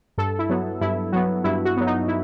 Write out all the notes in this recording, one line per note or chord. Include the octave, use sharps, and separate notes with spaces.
G2 A4
E4
F#3 B3
G2 E4
F#3 B3 F#4
G2 E4
F#4
F#3 B3
D#4
E4